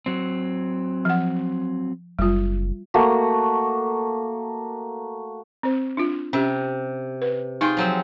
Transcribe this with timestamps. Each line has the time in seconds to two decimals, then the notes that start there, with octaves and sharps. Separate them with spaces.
0.06 F#3 C4
1.05 F3 F#5
2.19 F#1 G3 F4
2.94 A3 A#3 F#4
5.63 C4 C5
5.97 D4 F4
6.33 C3 C#4 G4
7.22 B4
7.61 D#4 F4 G#4 G5 C6
7.77 F3 F#3 C4